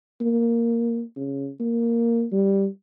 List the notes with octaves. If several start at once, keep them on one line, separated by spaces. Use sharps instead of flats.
A#3
C#3
A#3
G3